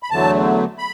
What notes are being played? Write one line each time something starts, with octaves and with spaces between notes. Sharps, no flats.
B5
E2 D3 F#3 A3 A5
B5